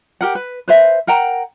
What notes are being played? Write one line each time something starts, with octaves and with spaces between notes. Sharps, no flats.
G4 A#4 F#5
B4
B4 C5 E5
A#4 F#5 G5 A#5